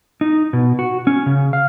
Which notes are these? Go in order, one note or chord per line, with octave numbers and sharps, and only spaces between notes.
D#4
B2
F#4
C#4
C#3
F5